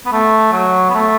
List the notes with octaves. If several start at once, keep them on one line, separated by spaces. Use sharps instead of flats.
B3
A3
F#3
B3
A3